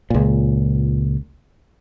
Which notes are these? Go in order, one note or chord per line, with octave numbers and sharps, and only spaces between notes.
C#2 A#2